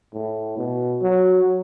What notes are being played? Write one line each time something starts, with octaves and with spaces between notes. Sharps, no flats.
A2
B2
F#3